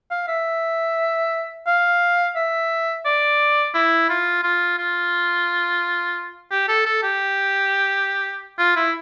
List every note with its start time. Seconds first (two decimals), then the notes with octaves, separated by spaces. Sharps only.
0.11 F5
0.28 E5
1.67 F5
2.36 E5
3.06 D5
3.74 E4
4.09 F4
4.43 F4
4.78 F4
6.51 G4
6.68 A4
6.86 A4
7.03 G4
8.59 F4
8.76 E4